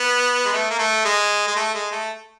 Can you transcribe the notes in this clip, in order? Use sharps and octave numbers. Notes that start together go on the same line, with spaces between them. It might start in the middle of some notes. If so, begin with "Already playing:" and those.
Already playing: B3
G#3
A3
A#3
A3
G#3
G#3
A3
G#3
A3